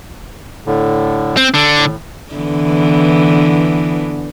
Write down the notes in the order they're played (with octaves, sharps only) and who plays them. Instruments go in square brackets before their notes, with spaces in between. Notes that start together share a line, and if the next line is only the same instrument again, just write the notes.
[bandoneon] A2 D3
[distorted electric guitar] C4
D3
[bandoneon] A2
[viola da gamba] D3 E3 B3